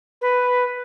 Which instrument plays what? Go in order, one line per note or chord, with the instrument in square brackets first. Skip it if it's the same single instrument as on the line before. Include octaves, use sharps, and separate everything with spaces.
[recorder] B4